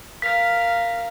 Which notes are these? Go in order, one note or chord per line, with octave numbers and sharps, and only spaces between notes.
A#4 F5 B6